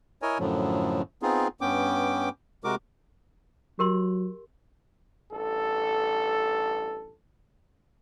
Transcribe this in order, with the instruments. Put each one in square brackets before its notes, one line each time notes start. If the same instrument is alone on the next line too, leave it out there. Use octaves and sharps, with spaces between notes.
[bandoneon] E4 A#4 C#5 D#5 G#5
F#2 A2 D3 F3 F#3
B3 C4 D#4 F4 G#4
G2 B3 C#4 G5 D6
C3 G#3 F#4 A#4 D6
[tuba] F#3 [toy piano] G4 A#4 C6
[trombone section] A1 G2 A4